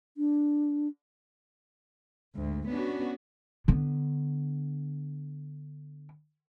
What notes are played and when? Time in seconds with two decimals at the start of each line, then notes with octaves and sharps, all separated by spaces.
0.17 D4
2.35 D2 G#2
2.68 B3 C#4 D4 F#4
3.68 D3 B3